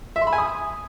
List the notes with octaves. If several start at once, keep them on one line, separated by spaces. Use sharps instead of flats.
E5
C6
B5
G#5
D#6